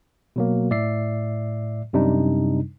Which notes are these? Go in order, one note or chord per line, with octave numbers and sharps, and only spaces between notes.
B2 F#3 A#3
A2 D5 E5 C7
F#2 C3 G3 D4 D#4